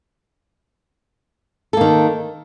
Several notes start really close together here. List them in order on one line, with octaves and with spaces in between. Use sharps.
A4 A#3 D#3